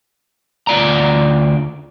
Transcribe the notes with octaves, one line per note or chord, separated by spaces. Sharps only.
D2 F4 D5 A#5